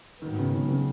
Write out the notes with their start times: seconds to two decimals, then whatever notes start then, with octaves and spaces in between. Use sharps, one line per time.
0.22 G#2 D#3 F#3 B3
0.39 C#3
0.54 D#3
0.70 C#3